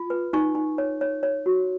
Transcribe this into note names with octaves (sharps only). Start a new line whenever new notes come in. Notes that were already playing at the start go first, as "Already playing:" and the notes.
Already playing: F4
B4
D#4 C#6
D#4
C#5
C#5
C#5
F#4